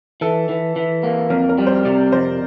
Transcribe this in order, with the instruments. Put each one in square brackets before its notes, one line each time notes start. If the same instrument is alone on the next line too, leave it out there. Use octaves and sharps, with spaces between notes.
[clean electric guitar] E3 [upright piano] A4
[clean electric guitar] E3
E3
A#3
[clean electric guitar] F2 [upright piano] A#4
[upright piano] A#4
[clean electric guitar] G3
[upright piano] C5
[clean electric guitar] C3 [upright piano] D5
[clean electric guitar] F2 [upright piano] C5